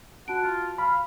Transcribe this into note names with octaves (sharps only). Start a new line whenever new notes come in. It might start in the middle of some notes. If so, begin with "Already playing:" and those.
F#4 F#5 A5 D7
F4
F5 B5